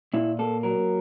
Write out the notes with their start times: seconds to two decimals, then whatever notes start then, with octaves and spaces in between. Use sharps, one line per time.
0.14 A#2 E4
0.39 A#3 A4
0.63 F#3 A#4